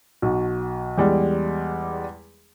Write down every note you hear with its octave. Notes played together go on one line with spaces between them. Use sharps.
B1 F#4
E2 G3 G#3